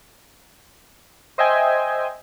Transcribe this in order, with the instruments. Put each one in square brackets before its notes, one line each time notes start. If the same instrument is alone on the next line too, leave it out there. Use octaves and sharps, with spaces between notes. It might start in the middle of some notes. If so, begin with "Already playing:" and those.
[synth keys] C5 D#5 E5 G5 G#5